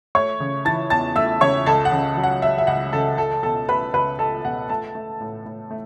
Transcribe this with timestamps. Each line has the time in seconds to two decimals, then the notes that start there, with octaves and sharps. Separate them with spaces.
0.15 A3 C#5 C#6
0.40 C#3
0.65 E3 A5 A6
0.90 E2 A5 A6
1.16 A3 E5 E6
1.41 C#3 C#5 C#6
1.66 C#2 A4 A5
1.85 F#5
1.92 C#3
2.17 F#3
2.23 F#5
2.42 C#2 E5
2.58 E5
2.67 C#2 F#5
2.93 C#3 A4 A5
3.17 C#2 A4 A5
3.43 B2 A4 A5
3.69 A3 B4 B5
3.94 C#2 B4 B5
4.19 C#2 A4 A5
4.45 B2 F#5
4.69 A3 A4 A5
4.95 A3
5.21 A2
5.46 A2
5.71 A3